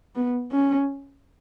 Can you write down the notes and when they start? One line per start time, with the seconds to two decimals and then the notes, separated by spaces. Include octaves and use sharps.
0.16 B3
0.52 C#4